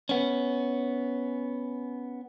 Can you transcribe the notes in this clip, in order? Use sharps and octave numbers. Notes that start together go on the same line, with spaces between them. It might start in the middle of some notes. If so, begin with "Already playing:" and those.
B3 C#4